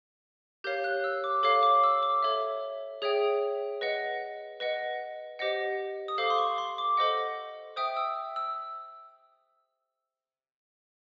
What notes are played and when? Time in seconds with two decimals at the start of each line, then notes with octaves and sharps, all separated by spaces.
0.64 G4 A#4 C#5 F5 G6
0.84 F#6
1.04 E6
1.24 D6
1.43 A4 C#5 F5 D6
1.63 D6
1.84 E6
2.03 D6
2.23 A4 C#5 E5
3.02 G#4 C#5 E5 G5 D#6
3.81 B4 D#5 F#5
4.60 B4 D#5 F#5
5.39 G4 C5 D#5 F#5
6.08 D#6
6.18 A4 C5 F5 D6
6.30 C6
6.38 C#6
6.58 C6
6.78 D6
6.97 A4 C5 D#5 F#5
7.76 C5 E5 G5 D#6
7.97 E6
8.36 E6